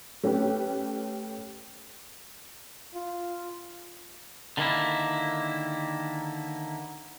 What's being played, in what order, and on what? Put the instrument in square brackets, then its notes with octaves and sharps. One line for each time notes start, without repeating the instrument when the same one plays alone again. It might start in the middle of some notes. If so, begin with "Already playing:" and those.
[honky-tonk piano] A3 C#4 G4 B4
[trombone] F4
[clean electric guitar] D3 D#3 A#3 E4